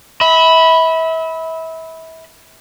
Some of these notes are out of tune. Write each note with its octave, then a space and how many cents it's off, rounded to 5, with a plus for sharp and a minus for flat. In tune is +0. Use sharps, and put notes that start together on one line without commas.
E5 -30 B5 +0